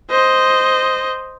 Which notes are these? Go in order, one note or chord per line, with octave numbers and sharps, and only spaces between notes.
C5 D#5